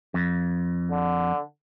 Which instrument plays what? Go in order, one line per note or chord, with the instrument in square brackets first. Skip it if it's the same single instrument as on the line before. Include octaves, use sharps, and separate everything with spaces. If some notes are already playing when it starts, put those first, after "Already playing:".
[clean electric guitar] F2
[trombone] D3